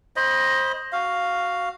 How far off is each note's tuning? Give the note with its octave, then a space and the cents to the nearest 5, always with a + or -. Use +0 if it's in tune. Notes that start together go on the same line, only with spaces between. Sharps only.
C5 +20 D#5 +0 B5 -15
F#4 +0 F5 +0